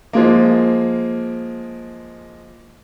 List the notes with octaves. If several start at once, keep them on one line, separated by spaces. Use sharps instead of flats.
F3 G#3 A#3